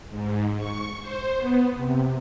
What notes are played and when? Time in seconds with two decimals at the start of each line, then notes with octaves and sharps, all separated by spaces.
0.10 G#2
0.57 C#6
1.01 C5
1.37 B3
1.75 C3